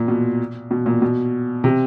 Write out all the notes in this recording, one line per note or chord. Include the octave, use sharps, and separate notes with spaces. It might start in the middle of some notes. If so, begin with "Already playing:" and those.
Already playing: A#2
B2
B2
A#2
B2
C3